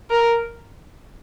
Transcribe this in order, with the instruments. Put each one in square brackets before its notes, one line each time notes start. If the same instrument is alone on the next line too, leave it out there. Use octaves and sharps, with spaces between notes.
[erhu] A#4